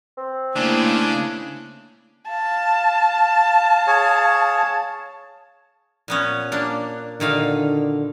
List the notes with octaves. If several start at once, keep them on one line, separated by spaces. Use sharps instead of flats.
C4
C#3 A3 A#3 D4 E4
F5 A5
G#4 C#5
A#2 B3 C#4
A#3 D4
A#2 D3 D#3 F5